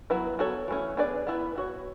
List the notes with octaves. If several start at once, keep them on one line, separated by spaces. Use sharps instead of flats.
F#3 B3 E4 B4
B3 F#4 A4 C#5
E3 A3 C#4
B3 D4 G#4 B4 D5
B3 E4 B4
B3 F#4 C#5